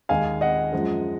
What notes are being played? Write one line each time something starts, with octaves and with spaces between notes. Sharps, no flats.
D#2 D#3 G#3 F5 G#5
D#5 F#5
F#2 F3 G#3